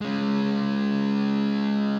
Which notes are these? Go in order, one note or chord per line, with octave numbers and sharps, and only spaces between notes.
G#3 C#4